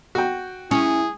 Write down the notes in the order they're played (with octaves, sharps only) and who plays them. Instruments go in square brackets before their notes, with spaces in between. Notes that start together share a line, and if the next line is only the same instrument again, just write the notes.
[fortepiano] F#4 G5
[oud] C#4 [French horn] E4 [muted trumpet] G#4